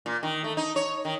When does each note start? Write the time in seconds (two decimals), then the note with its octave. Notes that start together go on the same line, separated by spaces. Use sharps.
0.06 A#2
0.23 D#3
0.44 A3
0.57 D#4
0.76 C#5
1.05 D#3